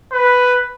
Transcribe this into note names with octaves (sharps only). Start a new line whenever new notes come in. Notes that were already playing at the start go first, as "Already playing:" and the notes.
B4